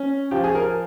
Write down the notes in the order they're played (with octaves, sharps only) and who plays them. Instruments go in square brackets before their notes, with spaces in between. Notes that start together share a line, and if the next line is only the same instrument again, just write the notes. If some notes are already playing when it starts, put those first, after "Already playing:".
Already playing: [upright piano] C#4
F3 G4
G#4
A#4